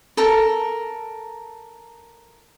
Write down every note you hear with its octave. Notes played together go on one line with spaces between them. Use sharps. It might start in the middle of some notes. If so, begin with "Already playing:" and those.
A4 A#4